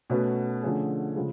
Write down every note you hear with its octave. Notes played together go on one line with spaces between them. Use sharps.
B2 A3 C#4 F#4 B4
D3 F3 A3 C#4 G#4
C#3 F3 G#3